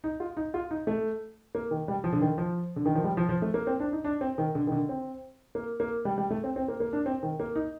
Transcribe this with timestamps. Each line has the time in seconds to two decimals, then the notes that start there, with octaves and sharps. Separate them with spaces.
0.04 D#4
0.20 F4
0.37 D#4
0.54 F4
0.71 D#4
0.87 A3
1.55 A#3
1.71 D#3
1.88 G3
2.04 F3
2.13 D3
2.21 D#3
2.38 F3
2.76 D3
2.86 D#3
2.95 F3
3.04 G3
3.17 F3
3.29 F3
3.42 A3
3.54 A#3
3.67 C4
3.80 D4
3.93 D#4
4.04 D4
4.21 C4
4.38 D#3
4.55 D3
4.67 D#3
4.72 D3
4.89 C4
5.55 A#3
5.80 A#3
6.05 G3
6.18 G3
6.31 A3
6.44 C4
6.56 C4
6.68 A#3
6.80 A#3
6.93 D4
7.06 C4
7.23 D#3
7.40 A#3
7.55 D#4